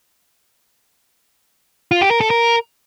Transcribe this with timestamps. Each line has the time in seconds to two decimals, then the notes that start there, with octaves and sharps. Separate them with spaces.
1.91 F4
2.01 G4
2.11 A#4
2.21 A4
2.30 A#4